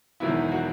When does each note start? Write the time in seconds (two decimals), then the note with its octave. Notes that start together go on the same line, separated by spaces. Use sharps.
0.20 E1 E2 D#3 F#3 B3 E4
0.52 F#4